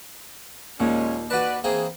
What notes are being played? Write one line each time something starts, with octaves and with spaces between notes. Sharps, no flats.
D#2 A#2 G#3 C#4
F#4 B4 D5 A5
E3 A#3 C4 G#4